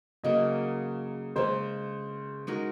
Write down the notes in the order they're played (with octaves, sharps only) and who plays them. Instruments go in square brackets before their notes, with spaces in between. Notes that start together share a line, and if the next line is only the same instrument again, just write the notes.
[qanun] C#3 F#3 A#3 [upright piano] D#5
[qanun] C#3 G#3 C#4 [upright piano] C5
[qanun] G#3 D#4 F#4 A#4